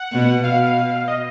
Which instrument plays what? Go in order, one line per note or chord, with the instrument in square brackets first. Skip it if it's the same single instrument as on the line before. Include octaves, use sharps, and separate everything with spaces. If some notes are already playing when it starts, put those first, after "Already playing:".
Already playing: [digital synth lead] F#5
[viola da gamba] B2
[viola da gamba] B2 [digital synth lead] F5
[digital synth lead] D#5